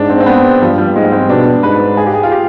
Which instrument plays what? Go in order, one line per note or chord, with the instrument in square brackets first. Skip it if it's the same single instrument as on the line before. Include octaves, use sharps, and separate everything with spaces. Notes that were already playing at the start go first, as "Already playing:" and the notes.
Already playing: [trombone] G#2 [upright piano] D4
[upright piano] C4
C4
B3
[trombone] G2 [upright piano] F3
[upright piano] G3
[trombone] G#2 [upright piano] G#3
[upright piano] C4
[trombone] B2 [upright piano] D4
[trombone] G#2 [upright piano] B4
[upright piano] G#4
G4
G#4
F4
G4